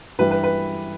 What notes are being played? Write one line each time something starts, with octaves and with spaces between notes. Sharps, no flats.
G2 E3 G3 B4
B4
B4